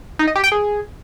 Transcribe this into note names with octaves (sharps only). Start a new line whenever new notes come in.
D#4
D#5
G4
G5
G#4